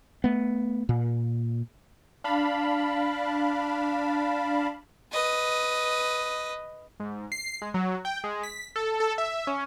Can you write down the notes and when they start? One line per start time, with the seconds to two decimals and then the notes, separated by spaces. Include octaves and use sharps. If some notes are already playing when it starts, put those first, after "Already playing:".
0.24 A3 B3
0.89 A#2
2.24 D4 F5 A5 B5
5.11 B4 D#5
7.00 G#2
7.32 C7
7.62 G#3
7.74 F#3
8.05 G5
8.24 G#3
8.43 B6
8.76 A4
9.00 A4
9.18 E5
9.47 C#4